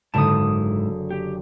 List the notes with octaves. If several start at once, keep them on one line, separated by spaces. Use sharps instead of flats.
F#1 G#2 D3 E4 A5 D#6
G4